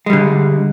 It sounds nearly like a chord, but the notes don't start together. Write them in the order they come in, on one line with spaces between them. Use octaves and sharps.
G#3 G3 D3